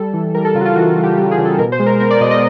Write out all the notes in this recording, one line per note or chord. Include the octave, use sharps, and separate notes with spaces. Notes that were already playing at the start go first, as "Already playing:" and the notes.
Already playing: G3 A4
E3
G3 A#4
A4
C#3 F4
F#4
F4
E3 F#4
G3
G4
G3 G4
G#4
C#3
A4
B2 A#4
C5
G#3
A#4
B3 A#4
D5
B2 D#5
D#5